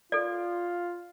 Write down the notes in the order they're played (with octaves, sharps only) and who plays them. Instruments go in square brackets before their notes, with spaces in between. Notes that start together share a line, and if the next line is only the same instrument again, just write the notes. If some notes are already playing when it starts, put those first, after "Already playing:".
[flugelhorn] F4 [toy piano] A4 D5